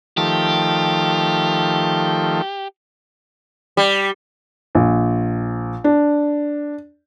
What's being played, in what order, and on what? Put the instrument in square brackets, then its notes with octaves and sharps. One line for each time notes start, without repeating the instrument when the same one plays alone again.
[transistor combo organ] D#3 F3 A3 [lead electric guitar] G4
[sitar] G3
[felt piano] A#1
D4